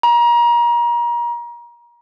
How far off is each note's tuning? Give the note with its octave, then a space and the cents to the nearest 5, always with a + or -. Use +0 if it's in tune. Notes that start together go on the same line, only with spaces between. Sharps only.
A#5 +30